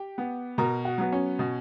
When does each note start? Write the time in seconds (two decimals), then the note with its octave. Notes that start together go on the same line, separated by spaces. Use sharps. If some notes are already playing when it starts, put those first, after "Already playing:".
Already playing: G4 G5
0.18 B3
0.58 B2 A#4 A#5
0.85 F#4 F#5
0.98 F#3 B3
1.12 C#4 C#5
1.39 B2